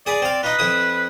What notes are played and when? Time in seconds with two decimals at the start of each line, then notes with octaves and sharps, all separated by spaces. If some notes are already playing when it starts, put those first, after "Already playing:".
0.06 G#4 B4 D5
0.22 C4 F5
0.43 D#4 F4 B4
0.59 F2 E4 D#6